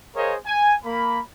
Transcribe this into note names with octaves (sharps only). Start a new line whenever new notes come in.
G#4 A#4 C5 C#5 D#5 F5
G#5
A#3 B5